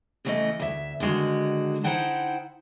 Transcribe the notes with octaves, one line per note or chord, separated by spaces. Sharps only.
A2 C#3 E3 G#3 A3 D#5
D2 E5
D3 D#3 G#3 F#4
D#4 E4 C5 F#5 G5 A5